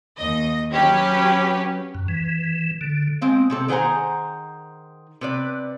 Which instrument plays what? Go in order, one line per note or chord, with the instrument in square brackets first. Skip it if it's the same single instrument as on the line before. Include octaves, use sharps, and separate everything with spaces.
[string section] D#2 D#5
F#3 C#4 G4 B4
[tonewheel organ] F#2
E3
D3
[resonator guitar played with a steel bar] G#3 C4 F5
C3 C4 A4
D#3 G#4 C5 F#5 G#5 A#5
C3 B4 D5